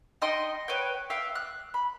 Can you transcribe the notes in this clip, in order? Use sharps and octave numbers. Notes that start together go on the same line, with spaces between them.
D#4 D#5 G5 C6
B4 C#5 G5
E5 F5 G5
F#6
B5